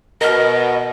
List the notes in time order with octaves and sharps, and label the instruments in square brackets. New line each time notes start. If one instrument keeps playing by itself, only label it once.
[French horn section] B2 [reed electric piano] A#4 F6 [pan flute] D#5